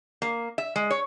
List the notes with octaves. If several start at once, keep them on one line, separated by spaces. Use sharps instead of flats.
A#3
E5
G#3
C#5